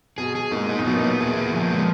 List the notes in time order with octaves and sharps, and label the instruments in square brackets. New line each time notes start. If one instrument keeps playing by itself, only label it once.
[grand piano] B2 [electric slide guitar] G#4
[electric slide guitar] G#4
[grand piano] A#2 [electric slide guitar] D#4
[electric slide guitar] D#4
[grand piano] A#2
[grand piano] B2 [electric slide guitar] B3
[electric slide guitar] B3
G#4
B3
F3
G#3